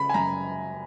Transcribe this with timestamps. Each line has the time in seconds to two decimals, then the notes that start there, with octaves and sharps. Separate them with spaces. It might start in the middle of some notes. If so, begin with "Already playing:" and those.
Already playing: C#3 B5
0.09 G#5
0.14 F#2 A#5